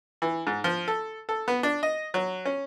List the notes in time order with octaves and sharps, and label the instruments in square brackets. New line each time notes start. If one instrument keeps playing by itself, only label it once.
[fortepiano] E3
G#2
F3
A4
A4
B3
D4
D#5
F#3
C#4